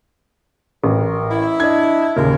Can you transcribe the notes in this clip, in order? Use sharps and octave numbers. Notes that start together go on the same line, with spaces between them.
A1 A#4
E4
D4 D#5 G#6
D#2 A#2 C#3 A#4